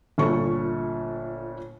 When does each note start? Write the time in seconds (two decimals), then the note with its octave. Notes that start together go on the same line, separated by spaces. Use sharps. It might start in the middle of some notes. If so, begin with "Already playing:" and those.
0.18 G1 A#2 A4 C#6